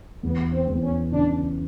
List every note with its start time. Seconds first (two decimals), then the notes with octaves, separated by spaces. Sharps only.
0.23 E2 B3
0.52 C4
0.68 E2
0.83 C#4
1.12 C#3 D4